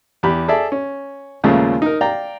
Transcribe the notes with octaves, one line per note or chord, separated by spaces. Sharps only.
E2 G4 B5
G#4 A4 D5 E5
C#4
D#2 A#2 C#3 F3 G#3 A3
D#4 A#4
D5 F5 G5 A#5